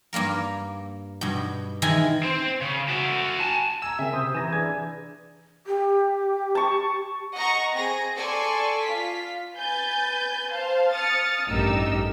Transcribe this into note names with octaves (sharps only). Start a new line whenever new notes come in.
G2 G3 A#3 A#4
G2 B2
D#3 E3 G#3 E4 G#5
C4 C5
C#3
F#4 E5
G#5 A5
G#5 A#5 E6 E7
C#3 C4 A#4 E5
C3 C6 D#6 E6 G6
E3 G#5 A#5 A#6 E7
D4 G#4 G#6
G4
A5 C#6
D#5 F#5 A#5 C#6
C4 G#4 A#6
A4 D5 G#5 C6 C#6
F4 B6
B4 G#5 G6 A6
C5 F5 A5
D#6 F6 A6 C#7
A1 G2 D#4 G4 A#4 E6